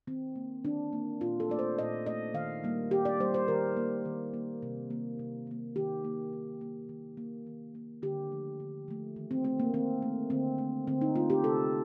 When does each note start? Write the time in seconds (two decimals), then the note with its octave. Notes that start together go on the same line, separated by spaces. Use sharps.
0.07 D#3 C4
0.36 A#3
0.65 D#3 D4
0.93 A#3
1.21 A#2 F4
1.40 A4
1.50 A3 D5
1.59 C5
1.78 A#2 D#5
2.06 A3 D#5
2.34 D#3 F5
2.64 G3 A#3
2.91 D#3 G4
3.05 D5
3.20 G3 A#3 C5
3.34 C5
3.48 D#3 A#4
3.77 A#3
4.05 D#3
4.34 A#3
4.62 C3
4.90 D#3 A#3
5.19 C3
5.47 D#3 A#3
5.76 D#3 G4
6.05 A#3
6.33 D#3
6.61 A#3
6.89 D#3
7.17 A#3
7.47 D#3
7.75 A#3
8.02 D3 G4
8.32 F3 A3
8.60 D3
8.88 F3 A3
9.16 D#3
9.31 C4
9.45 A3 C4
9.60 A#3
9.74 D#3 C4
10.02 A3
10.30 D3 C4
10.58 A3
10.87 D3 C4
11.01 D#4
11.16 A3 F4
11.30 G4
11.44 C3 A4